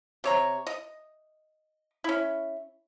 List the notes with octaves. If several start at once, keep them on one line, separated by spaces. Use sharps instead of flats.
C3 C#5 A#5
D#5
C#4 E4